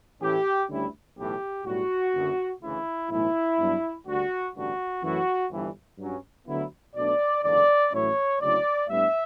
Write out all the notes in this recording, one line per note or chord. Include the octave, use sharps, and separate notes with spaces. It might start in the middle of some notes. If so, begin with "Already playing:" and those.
A2 E3 A3 C#4 E4 G4
D2 D3 G3 C#4 E4
B1 A2 E3 G4
B1 A2 G3 F#4
F#1 F#2 D3
D2 C#3 E3 E4
B1 A2 E3 A3 E4
G2 F#3 B3 D4
D2 D3 G3 D4 F#4
A1 G2 D3 F#4
F#2 E3 A3 C#4 E4 F#4
G1 G2 E3
G2 F#3 C#4
D2 D3 F#3 B3 E4
B1 B2 A3 D4 D5
F#1 E2 D3 D5
A1 A2 F#3 C#4 E4 C#5
D2 C#3 F#3 C#4 E4 D5
A2 G3 B3 D4 E5